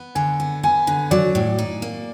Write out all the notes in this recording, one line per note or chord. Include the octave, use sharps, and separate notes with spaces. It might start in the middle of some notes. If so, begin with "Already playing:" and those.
Already playing: B3
D3 G#5
B3
B3 G#5
D3
F#3 D5
A2
D#4
A#3